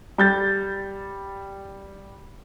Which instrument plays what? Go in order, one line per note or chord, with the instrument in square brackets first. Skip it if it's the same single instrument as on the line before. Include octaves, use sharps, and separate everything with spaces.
[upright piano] G3 G6 A6